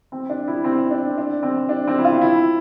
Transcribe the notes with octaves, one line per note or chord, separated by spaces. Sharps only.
C4
D4
E4
C4
D4
D4
C4
D4
C4
E4
F4
E4